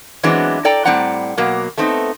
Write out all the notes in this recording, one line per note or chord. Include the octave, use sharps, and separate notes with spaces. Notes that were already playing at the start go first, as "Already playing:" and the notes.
E3 F#3 G#3 B3 C4 D4
A4 D5 G5 A#5
A2 G3 C4 D5 F#5 A#5
B2 F#3 A#3
A3 B3 C4 D#4